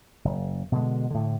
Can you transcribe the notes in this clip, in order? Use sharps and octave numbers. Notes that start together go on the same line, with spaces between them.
F#1
B2 D3 G#3
A2 D3